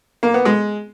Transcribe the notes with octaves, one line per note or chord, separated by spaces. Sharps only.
A#3
B3
G#3